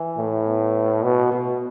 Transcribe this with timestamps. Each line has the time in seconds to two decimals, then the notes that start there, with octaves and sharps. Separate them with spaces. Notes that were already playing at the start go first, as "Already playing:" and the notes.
Already playing: E3
0.18 A2
0.46 B3
1.03 B2 B3
1.32 B2